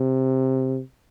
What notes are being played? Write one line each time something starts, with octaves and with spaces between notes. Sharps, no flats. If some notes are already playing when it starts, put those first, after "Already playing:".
Already playing: C3